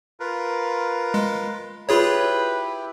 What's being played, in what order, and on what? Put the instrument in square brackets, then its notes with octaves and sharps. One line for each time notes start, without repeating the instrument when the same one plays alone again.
[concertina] F4 A#4 B4
[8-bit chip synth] G#3
[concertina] E4 G4 [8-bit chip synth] F4 G#4 C#5 [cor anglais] B4